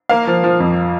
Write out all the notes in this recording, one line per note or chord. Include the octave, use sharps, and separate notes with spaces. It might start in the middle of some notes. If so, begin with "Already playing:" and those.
A#3 F5
F3
F3
F2